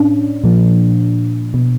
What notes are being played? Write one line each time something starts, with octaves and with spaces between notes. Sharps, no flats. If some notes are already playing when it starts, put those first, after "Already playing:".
Already playing: A2 C#4 D4
A#2 F3
B2